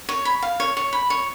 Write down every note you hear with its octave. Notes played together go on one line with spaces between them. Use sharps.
C#5
B5
F5
C#5
C#5
B5
C#5